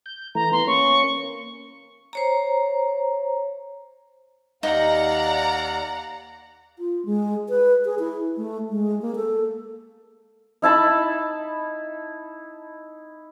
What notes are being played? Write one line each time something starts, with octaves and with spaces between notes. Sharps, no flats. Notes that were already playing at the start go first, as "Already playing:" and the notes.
G6
E3 A3 A#5
B3 C6
A#3 C#4 C#6
C5 C#5 A#5
D#2 D#4 D5 F5 F#5 A#5
F4
G#3
B4
G#4
E4
A3
G#3
A#3
A4
D#4 E4 A5 B5